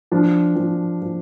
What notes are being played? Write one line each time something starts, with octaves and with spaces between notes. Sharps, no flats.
F3 D4
F3
F3